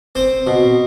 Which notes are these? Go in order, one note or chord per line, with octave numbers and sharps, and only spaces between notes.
C4 C5
B2